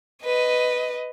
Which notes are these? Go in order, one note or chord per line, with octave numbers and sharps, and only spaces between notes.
B4 D#5